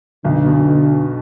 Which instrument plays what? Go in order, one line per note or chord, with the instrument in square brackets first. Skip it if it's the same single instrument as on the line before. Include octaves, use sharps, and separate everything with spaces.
[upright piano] B1 [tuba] D3
[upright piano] B2